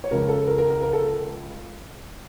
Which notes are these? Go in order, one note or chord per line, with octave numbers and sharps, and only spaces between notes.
C#5
C#2 C#3 F3 A#4
A4
A#4
A#4
A#4
A#4
A4